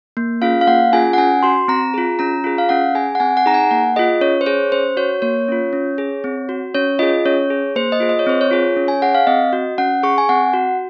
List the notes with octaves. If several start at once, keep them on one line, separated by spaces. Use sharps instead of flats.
A#3
C#4 F4 G#4 F5
F5
A#3 F#5
C#4 F4 G#4 G#5
F#5
C#4 G#5
F#4 C6
C4 A#5
F4 G#4
C#4 A#5
F4 G#4
F5
C#4 F#5
G#4 G#5
F#5
C4 G#5
F#5
D#4 G#4 A#5
G#5
A#3 F#5
F4 G#4 D#5
C#4 C#5
C5
G#4 C#5
C#4 C5
F#4 C#5
A#3 C#5
C#4 F4
C#4
G#4
C4
F#4
C#4 C#5
F4 G#4 D#5
C#4 C#5
G#4
A#3 C5
D#5
F4 G#4
D#5
C#5
C4 C5
C#5
F4 G#4
C#4
G#5
G#4 F#5
F5
C4 D#5
F#4
C#4 F#5
G#4 C#6
G#5
C4 F#5
F#4